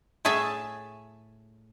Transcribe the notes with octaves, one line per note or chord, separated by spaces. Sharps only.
A2 A3 G#4 E5 A5